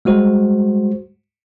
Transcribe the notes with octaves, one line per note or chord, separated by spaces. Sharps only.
G3 G#3 F#4 C5